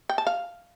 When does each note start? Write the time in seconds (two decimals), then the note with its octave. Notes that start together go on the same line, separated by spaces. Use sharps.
0.09 G5
0.18 A5
0.27 F5